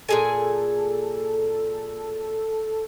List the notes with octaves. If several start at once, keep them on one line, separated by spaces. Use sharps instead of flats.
A#2 G#4 A4 G#5